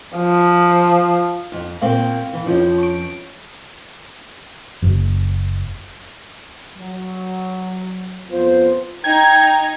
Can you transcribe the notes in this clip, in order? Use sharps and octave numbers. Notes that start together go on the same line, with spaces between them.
F3
F2
A#2 A#3 C4 F5 C#6
E3
F2 F3 C#4 F4 C#5
C#6 D7
F#1
F#3
F2 B3 F4 C5
D#4 G5 G#6